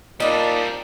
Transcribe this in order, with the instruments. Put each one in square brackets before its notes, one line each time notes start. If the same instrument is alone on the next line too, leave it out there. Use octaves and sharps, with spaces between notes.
[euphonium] A#2 [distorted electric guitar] G3 C4 [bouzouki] D4 D#4